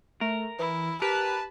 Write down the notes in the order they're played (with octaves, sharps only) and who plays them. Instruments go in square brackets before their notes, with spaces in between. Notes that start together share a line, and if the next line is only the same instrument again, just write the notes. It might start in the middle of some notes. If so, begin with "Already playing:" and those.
[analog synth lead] A3 [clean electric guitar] A#4
[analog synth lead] E3 [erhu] E4
[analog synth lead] G4 [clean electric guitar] A#4 [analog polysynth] B4 [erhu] A5